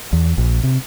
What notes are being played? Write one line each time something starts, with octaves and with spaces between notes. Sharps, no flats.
E2
A#1
C3